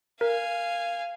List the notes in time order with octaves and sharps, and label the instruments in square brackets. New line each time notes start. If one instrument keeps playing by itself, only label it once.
[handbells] A#4 [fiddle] F5 G#5